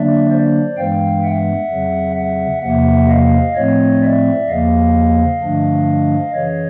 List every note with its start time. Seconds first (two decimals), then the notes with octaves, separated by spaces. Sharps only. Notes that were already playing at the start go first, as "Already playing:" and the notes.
Already playing: D3 F#3 A#3 D4 D5 E5
0.31 C5 D5
0.77 G2 E3 G#3 B3 F5 G5
1.24 E5 F#5
1.70 F2 C#3 F#3
2.16 E5 F#5
2.62 E2 C3 F3 A#3 E5 F#5
3.09 D#5 F5
3.56 A2 F3 A3 C4 C#5 D#5
4.02 D5 E5
4.48 E2 C#3 F3 A#3 D#5 F5
5.42 G2 D3 F3 A3 D4
6.34 F#2 C#3 E3 C#5 D#5